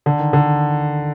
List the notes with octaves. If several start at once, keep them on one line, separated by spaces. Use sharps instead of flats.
D3
D#3
D3